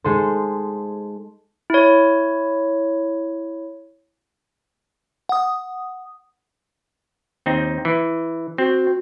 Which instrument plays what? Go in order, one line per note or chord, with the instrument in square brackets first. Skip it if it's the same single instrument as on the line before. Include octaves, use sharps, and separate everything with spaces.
[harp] G#3 D#4 A4 C5
[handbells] E4 C#5
[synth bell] F#5 D#6
[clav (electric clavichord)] D#2 C4 D#4
E3
[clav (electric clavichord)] C4 [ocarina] F#4